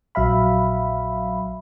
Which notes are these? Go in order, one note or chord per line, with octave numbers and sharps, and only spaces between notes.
A#1 F#3 E5 F5 B5